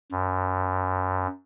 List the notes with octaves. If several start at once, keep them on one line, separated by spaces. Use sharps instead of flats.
F#2